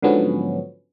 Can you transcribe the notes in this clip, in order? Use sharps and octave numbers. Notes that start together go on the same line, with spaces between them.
G#2 D3 F3 F#3 B3 C#4